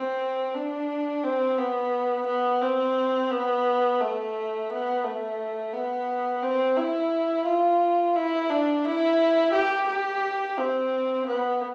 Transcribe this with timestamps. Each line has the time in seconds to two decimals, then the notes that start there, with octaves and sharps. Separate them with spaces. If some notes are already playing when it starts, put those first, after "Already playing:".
Already playing: C4
0.55 D4
1.24 C4
1.58 B3
2.27 B3
2.61 C4
3.31 B3
4.01 A3
4.70 B3
5.04 A3
5.73 B3
6.43 C4
6.77 E4
7.46 F4
8.16 E4
8.50 D4
8.85 E4
9.54 G4
9.88 G4
10.58 C4
11.28 B3